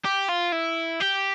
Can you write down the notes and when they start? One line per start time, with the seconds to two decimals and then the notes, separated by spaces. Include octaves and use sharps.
0.05 G4
0.29 F4
0.52 E4
1.01 G4